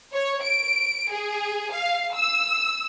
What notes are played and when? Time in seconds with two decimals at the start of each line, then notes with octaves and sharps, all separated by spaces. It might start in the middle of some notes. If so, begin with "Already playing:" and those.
0.13 C#5
0.43 D7
1.10 G#4
1.71 F5
2.14 E6